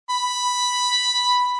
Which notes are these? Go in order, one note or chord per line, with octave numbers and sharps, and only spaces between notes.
B5